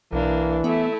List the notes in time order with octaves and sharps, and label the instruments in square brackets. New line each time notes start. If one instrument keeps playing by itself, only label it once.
[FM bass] B1 [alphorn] E3 [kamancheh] A#3 D4
[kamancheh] A3 E4 [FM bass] B3